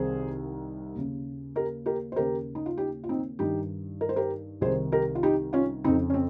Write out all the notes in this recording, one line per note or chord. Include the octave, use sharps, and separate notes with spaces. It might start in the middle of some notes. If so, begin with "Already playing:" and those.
Already playing: C2 C3 D#3 G#4 C5
D#2 C#3
G4 A#4
G4 A#4
C5
D#2 C#3 G4 A#4
D#4
F4
D#4 G4
F4
C4 D#4
G2 D#3 D#4 G4
A#4
C5
G4 A#4
C2 C3 D#3 G#4 C5
G4 A#4
F4
D#4 G4
C#4 F4
F2 C#3 C4 D#4
C#4
C4